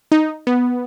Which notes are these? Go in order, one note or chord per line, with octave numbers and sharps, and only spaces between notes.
D#4
B3